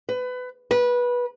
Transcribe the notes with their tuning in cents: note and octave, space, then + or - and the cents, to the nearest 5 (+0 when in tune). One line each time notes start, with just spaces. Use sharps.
B4 +25
B4 -20